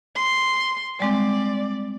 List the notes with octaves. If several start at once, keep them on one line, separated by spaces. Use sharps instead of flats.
C6
G3 G#3 C4 D5